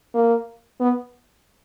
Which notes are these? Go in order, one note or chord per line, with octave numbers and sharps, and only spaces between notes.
A#3
B3